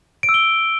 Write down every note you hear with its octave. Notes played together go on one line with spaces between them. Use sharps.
D7
E6
G7